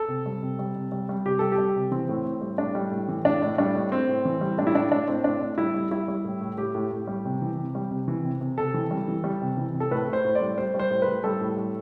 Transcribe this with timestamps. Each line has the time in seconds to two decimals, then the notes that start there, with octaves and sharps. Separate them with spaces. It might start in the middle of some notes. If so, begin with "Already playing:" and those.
Already playing: A4
0.08 C3
0.26 G3
0.43 C3
0.59 G3
0.75 C3
0.92 G3
1.09 G3
1.25 C3 G4
1.39 G3 A4
1.52 G4
1.58 G3
1.76 C3
1.91 E3 C4
2.09 A2
2.25 A2
2.41 G3
2.58 A2 D4
2.75 G3
2.91 A2
3.08 E3
3.25 A2 D4
3.42 A2
3.58 G3 D4
3.75 A2
3.91 A2 C4
4.09 A2
4.25 E3
4.41 G3
4.58 A2 D4
4.67 E4
4.74 A2 D4
4.91 A2 D4
5.08 A2 C4
5.24 A2 D4
5.41 A2
5.58 G3 E4
5.74 G3
5.91 G3 E4
6.08 G3
6.24 A2
6.41 A2
6.57 A2 G4
6.75 A2
6.91 A2
7.07 G3
7.25 C3
7.42 E3
7.58 C3
7.75 G3
7.91 C3
8.08 E3
8.24 C3
8.41 C3
8.58 C3 A4
8.74 E3
8.91 G3
9.08 E3
9.24 G3
9.42 C3
9.57 E3
9.74 C3
9.80 A4
9.91 A2 B4
10.08 A2
10.13 C5
10.25 A2
10.35 D5
10.41 G3
10.57 G3 C5
10.74 G3
10.79 C5
10.90 A2
11.02 B4
11.07 A2
11.24 G3 A4
11.41 A2
11.57 G3